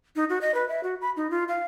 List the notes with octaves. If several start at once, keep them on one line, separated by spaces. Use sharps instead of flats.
D#4
F#4
D#5
B4
E5
F#4
B5
D#4
F4
F5